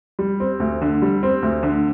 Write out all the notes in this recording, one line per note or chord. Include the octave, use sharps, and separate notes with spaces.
G3
C4
D2
D3
G3
C4
D2
D3